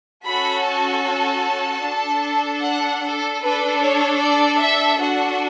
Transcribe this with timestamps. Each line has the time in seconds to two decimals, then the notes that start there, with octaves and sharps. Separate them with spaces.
0.24 C#4 F#4 A4 B5
0.64 A5
1.83 D4 A4
2.62 F#5
3.02 A4
3.41 D4 A4 B4
3.81 C#5
4.20 D5
4.60 E5
4.99 D4 F#4 A4 F#5